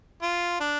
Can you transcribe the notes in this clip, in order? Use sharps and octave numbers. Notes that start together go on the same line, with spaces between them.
F4
D4